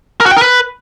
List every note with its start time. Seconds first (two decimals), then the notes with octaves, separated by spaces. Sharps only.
0.21 A#4
0.26 F#4
0.31 G5
0.37 A#4
0.42 B4